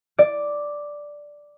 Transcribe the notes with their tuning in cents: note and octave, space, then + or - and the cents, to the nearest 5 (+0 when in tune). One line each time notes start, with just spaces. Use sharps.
D5 +0